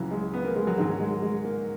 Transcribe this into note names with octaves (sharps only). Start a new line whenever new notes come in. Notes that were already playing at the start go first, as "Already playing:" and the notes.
Already playing: C#2 C#3 E3 F#3
G#3
B3
A#3
G#3
F#3
G#2 D#3 F#3 G#3
G#3
G#3
A#3